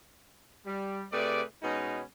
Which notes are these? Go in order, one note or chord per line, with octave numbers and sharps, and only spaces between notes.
G3
C3 A3 G#4 B4 D5
B2 G#3 B3 C#4 D#4